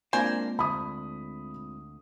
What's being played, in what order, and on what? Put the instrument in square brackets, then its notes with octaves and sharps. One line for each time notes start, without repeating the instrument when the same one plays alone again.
[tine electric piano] G#3 C4 F4 [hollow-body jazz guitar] A#3 D4 [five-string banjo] C5 G#5
[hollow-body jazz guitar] D2 [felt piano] B5 D#6